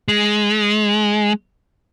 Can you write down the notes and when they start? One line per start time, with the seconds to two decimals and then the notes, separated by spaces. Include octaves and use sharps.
0.08 G#3